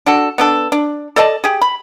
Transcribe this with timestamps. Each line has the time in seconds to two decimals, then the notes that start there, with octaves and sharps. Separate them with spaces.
0.06 D4 F#4 A4
0.38 B3 D4 A4
0.72 D4
1.16 A4 D5 D#5 A5
1.44 G4 G#4
1.61 B5